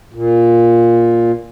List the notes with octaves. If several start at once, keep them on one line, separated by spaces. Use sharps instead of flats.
A#2